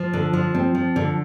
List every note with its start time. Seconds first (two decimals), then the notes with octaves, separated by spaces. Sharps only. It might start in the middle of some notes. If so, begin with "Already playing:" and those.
Already playing: F3
0.13 D3
0.33 F3
0.54 C4
0.75 F3
0.96 D3